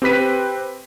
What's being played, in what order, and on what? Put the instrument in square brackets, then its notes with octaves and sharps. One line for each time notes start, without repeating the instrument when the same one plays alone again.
[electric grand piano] C4 G4 B4 B6 D#7